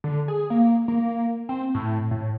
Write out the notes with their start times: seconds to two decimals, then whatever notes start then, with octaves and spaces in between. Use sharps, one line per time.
0.04 D3
0.28 G#4
0.50 A#3
0.88 A#3
1.49 C4
1.74 A2
2.11 A2